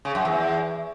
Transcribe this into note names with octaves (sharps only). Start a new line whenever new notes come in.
C#3
F#2
E2